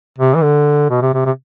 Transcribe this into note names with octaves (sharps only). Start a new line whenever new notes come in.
C3
E3
D3
B2
C3
C3
C3